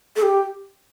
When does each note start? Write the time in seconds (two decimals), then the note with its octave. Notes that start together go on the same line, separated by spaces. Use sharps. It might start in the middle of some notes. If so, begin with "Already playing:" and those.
0.16 A4
0.22 G4